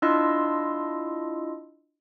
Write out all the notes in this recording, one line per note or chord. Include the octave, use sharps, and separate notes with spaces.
D4 E4 F4 D#5 C6 E6